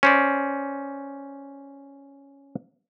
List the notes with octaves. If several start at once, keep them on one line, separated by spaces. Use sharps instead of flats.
C#4 C5 D5